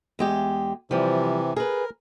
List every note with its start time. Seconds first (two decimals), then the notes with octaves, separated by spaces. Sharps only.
0.19 E2 G#3 G4
0.91 C3 E3 F3 G3
1.56 G#4 A#4 B4